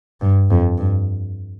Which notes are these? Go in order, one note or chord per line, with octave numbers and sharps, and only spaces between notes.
G2
F2
G2